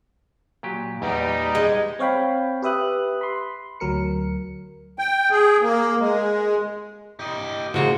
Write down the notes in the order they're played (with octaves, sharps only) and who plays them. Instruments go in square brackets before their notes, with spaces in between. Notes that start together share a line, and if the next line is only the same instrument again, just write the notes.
[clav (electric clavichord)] A#2 F#3 G4
[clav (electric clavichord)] E2 A#2 [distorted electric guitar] G3 G4 [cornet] D#4
[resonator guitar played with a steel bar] G#3
[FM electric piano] C4 C#5 F5 G5 B5
G4 B4 E5 D#6 F#6
B5 C6
D2 F#3 A#4 C#7
[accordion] G5
G#4
A#3
G#3
[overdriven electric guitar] G4 D#5
[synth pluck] A2 C#3 [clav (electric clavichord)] F3 G#3 A#3 [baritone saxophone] F#4